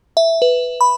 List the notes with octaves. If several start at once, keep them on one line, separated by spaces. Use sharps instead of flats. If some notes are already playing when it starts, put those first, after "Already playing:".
E5
B4
B5